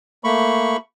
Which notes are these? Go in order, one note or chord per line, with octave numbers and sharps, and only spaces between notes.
A3 A#3 B5 C#6